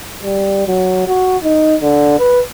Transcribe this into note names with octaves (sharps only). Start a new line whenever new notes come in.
G3
F#3
F#4
D#4
D3
B4